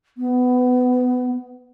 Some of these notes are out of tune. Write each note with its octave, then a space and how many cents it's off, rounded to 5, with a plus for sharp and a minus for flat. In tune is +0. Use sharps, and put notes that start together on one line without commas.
B3 +20